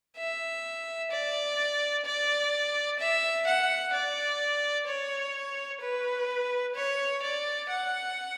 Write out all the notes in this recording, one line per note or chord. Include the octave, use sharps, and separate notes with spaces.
E5
D5
D5
E5
F#5
D5
C#5
B4
C#5
D5
F#5